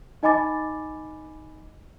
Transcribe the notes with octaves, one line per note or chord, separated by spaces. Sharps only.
D#4 D#5 G#5 B5 D6 A6